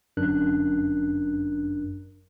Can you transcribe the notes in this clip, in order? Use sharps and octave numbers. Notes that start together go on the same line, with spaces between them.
G1 F#2 D4 A#4 F#6